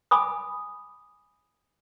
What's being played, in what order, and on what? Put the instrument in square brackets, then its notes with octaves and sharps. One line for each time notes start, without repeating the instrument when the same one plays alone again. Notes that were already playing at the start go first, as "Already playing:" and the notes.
[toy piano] G#5 B5 D6 D#6